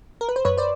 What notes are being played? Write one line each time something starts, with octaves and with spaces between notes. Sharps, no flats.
A#4
B4
C5
F#2 B4 C#5
C5 D5